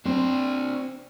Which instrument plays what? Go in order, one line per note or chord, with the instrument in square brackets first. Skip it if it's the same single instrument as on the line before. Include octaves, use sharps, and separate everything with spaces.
[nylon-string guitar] C4 [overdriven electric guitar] D4 C5